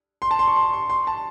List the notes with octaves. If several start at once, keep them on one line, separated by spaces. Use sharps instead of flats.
C6
A5
C6
C#6
C6
C6
C6
A5